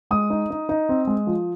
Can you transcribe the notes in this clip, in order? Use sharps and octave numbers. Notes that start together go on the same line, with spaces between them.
G#3 D#6
D#4
D#4
D#4
C4
G#3
F3